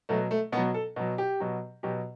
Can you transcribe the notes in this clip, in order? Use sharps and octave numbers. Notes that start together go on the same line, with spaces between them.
B2 F#3 A3
A3
B2 F#3 B3
A4
B2 F#3
G4
B2 F#3
B2 F#3 G4